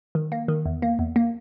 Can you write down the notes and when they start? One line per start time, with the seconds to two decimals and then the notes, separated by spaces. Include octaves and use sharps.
0.15 D#3
0.32 A#3
0.48 D#3
0.66 E2
0.82 A#3
0.99 E2
1.16 A#3